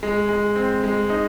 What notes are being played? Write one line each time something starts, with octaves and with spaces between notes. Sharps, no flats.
G#3
G#3
C4
G#3
D#4